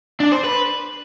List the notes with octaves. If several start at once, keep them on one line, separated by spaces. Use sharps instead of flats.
D4
C5
B4